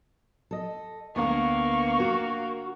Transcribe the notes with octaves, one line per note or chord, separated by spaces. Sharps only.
A4 D#5
D2 A#3 B3 A#4 C#6
F#4